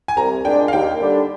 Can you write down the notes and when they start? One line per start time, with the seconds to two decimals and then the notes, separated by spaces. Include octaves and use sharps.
0.08 G#5
0.17 C2 A#5
0.45 A#2 G#3 D4 G5
0.68 F5
0.73 D#2 G5
1.00 D3 G3 D4